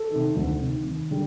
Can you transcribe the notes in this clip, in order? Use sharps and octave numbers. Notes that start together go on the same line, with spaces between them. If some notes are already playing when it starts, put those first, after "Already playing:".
Already playing: A4
C3 D#3
D2
C3 D#3
D#2
D3 G3